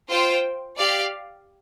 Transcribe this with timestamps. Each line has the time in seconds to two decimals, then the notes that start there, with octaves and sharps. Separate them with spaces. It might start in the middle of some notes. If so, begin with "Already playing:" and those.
0.10 F4 C5 G5
0.77 G4 D5 F5